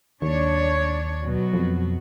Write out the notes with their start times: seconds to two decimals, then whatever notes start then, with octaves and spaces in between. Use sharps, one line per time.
0.22 D#2 D4 C#5
1.22 B2 F#3 F#4
1.54 F2